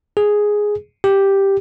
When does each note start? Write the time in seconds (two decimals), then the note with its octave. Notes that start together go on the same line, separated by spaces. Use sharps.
0.17 G#4
1.04 G4